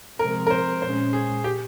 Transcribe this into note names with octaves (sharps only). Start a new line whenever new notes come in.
C3 F3 G#3 C4 A#4
A#4
C5
A#2 G#3 C#4 C5
G#4
G4